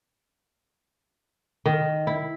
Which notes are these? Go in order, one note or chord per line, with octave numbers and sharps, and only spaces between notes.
D#3
E4